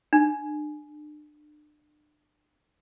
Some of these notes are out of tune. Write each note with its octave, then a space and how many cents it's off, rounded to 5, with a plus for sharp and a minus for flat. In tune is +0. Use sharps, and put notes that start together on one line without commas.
D4 +35